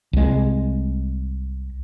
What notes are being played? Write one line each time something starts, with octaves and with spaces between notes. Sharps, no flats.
C2 G#3